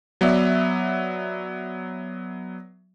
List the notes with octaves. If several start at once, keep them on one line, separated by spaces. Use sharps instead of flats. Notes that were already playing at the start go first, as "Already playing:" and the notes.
F#3 B3 D5 E5